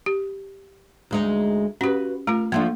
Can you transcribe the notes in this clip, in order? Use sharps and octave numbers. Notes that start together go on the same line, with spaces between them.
G4
D2 G#3 D#4
C#4 F#4 G4 B4
A3 F4 A#4
F3 A3 A#3 D4